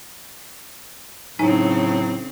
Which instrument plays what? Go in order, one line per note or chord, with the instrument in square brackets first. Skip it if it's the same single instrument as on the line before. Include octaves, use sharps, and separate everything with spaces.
[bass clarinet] A2 [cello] C#3 C4 [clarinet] F#3 [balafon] D#4 G#5